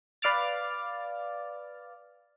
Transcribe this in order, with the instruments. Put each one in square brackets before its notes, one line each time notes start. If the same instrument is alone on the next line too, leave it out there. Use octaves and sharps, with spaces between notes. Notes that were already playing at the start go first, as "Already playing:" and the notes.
[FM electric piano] B4 D5 F5 D6 F6 A6